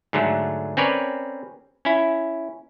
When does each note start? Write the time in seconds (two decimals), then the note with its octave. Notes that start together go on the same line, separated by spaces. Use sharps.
0.13 G#2 D3 F#3 A3
0.77 C4 C#4 A#4 B4 C#5 D5
1.85 C#4 E4